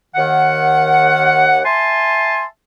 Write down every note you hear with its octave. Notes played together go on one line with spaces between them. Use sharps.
D#2 D#3 F#5
E5 G#5 A5 C6